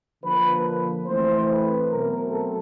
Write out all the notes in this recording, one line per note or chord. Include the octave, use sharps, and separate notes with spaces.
D3 F3 A#3 B4
E3 A3 C4 C5
B4
B2 F#3 A3 C4 A#4
A4